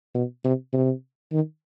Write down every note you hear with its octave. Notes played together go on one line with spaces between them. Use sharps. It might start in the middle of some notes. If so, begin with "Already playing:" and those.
B2
C3
C3
D#3